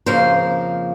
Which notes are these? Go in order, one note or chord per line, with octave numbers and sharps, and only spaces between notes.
F2 C#3 F3 A#3 C5